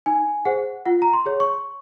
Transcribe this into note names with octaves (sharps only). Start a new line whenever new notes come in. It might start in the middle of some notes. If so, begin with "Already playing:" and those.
D#4 G#5
G#4 C5 F#5
F4 F#5
A#5
C6
G#4 C#5
C#6